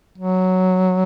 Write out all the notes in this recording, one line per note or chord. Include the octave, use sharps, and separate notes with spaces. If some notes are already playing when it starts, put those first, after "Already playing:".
F#3